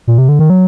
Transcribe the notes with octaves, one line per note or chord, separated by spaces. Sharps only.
A#2
C3
D3
D#3
F#3